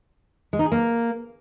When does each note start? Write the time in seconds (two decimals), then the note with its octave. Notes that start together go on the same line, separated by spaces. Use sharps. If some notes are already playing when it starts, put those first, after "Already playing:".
0.53 G#3
0.59 D#4
0.65 G#4
0.72 A#3